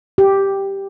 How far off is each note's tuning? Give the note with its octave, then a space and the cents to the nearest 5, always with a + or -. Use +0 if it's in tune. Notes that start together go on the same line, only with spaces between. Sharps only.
G4 +0